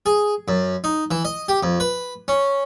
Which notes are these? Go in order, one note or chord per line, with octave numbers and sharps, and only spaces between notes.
G#4
F#2
D#4
E3
D#5
G4
F2
B4
C#4